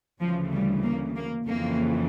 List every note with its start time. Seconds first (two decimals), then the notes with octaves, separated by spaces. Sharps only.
0.21 D2 C#3 E3 F3
0.52 G3
0.83 A#3
1.16 A#3
1.46 F2 C#3 E3 A#3